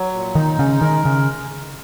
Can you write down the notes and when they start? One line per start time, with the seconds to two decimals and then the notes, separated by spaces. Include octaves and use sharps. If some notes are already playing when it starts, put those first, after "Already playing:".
Already playing: F#3
0.13 A#2
0.35 D#3 D#4
0.59 C#3 G#3
0.81 D#3 A#4
1.05 C#3 G#3